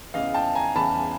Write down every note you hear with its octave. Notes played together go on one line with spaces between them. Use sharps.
E2 C#3 E3 D#5 F5
G5 A5
G#5 A#5
E2 C#3 E3 A5 B5